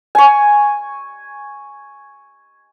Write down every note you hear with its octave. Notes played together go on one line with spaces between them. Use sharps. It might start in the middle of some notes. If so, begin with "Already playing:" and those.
G#5 C#6